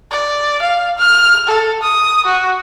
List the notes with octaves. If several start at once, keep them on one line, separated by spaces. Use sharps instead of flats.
D5
F5
F6
A4
D#6
F#4